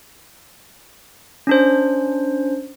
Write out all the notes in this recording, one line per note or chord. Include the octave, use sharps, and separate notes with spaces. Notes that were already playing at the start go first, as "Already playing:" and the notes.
C#4 D4 C5